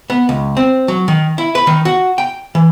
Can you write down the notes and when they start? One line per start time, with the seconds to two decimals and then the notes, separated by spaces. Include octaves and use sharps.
0.10 B3
0.29 C#2
0.57 C4
0.88 F#3
1.08 D#3
1.38 E4
1.55 B4
1.67 D#3
1.85 F#4
2.18 G5
2.55 E3